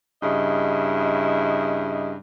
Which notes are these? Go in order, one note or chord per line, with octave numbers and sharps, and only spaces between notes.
G2 C#3 E4 D#5